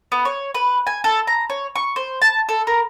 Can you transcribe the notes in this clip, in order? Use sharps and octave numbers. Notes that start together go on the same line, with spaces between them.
B3
C#5
B4
G#5
A4
A#5
C#5
C#6
C5
A5
A4
A#4